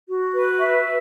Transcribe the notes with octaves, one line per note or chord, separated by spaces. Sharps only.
F#4
B4
E5